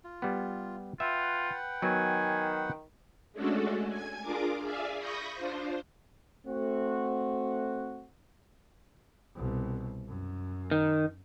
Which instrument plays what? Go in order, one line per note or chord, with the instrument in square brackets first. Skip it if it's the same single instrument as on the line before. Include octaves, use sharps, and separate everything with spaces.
[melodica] F4
[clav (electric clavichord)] G3 B3
[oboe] F4 [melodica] B4 F#5 G5 [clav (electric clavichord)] E5
[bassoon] D#3 [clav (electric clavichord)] F#3 B3 F#4 [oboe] G#5
[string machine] G#3 A3 C#4 D4 F#4 A4
G#5 G#6
D4 F4 G#4 A#4 D6
G#4 D5 E5 F5 G#5
B5 C#6 D#6 G6 A#6
D4 F4 C5
[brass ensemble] A3 C4 F#4
[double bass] C2 B2
F#2
[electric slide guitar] D#3